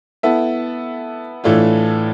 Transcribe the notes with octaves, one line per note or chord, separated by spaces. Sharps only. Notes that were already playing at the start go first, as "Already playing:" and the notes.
B3 E4 A4 E5
A2 E3 A3 D4 F4